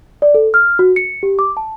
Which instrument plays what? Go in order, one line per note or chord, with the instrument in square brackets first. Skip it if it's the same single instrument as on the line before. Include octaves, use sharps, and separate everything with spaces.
[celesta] D5
A4
F6
F#4
C#7
G4
D6
A5